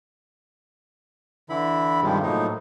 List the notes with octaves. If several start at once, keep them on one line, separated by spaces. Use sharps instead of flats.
D3 E3 E4 B5
G2 C3 D#3 F3 G3 G#3
A2 F3 F#3 A#3 D#4